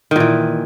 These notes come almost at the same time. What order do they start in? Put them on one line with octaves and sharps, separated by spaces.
D#3 A#2 E3